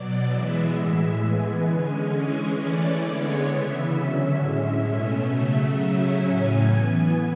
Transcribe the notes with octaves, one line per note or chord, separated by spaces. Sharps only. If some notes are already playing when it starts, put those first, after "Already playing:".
Already playing: B2 F#3 D5
E3 G#3 B3 E5
A2 E3 G#3
E3 G#3 B3 G#5
D3 G#3 C#4
E3 G#3 C#4
E3 A3 C#4 D5
D3 G#3 B3 C#5
C#3 E3 B3 E5
D3 F#3 C#4
A2 G#3 C#4
B2 A3 C#4 E5
C#3 F#3 A3
C#3 F#3 C#4 E5
A2 F#3 C#4 G#5
E3 B3